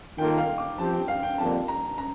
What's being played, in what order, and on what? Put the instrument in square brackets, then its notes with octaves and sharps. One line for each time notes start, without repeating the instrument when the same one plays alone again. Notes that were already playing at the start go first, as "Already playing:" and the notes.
[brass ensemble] D#3 A#3 F4 A4 [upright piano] G5
[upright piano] F5
D6
[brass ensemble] F3 C4 G4 [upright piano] A5
[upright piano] G5
F5
G5
[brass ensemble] F2 D3 G3 A#3 [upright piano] A5
[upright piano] A#5
A#5